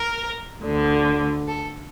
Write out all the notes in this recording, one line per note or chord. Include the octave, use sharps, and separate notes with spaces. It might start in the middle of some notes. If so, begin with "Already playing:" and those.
Already playing: A#4
D2 D3
A4